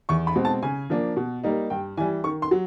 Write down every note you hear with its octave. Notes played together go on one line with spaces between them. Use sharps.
E2 C#6
B5
B2 G#3 C4
A5
C#3 G#5
F3 A#3 D4
B2
G3 A#3 D#4
G2 G5
E3 G3 G#5
D#3 C#6
C6
F#3